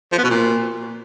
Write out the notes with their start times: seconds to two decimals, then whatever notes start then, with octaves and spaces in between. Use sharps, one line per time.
0.12 F3
0.18 B3
0.24 B2
0.30 A#2